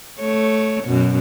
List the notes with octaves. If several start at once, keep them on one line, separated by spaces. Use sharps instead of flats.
A3 C#5
F#2 B2